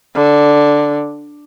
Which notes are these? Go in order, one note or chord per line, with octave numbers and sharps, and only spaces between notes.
D3